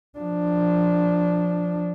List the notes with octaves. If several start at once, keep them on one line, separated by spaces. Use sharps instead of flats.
F3 D4